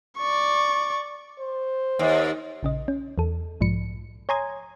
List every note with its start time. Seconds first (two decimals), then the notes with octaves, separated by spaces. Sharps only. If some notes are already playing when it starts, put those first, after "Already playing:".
0.18 D5 C#6
1.39 C5
1.99 D#2
2.63 A#1 C#3 D#5
2.88 C#4
3.18 E2 A4
3.61 B1 G#2 F3 C#7
4.29 C#5 G#5 A#5 C6 D#6 G#6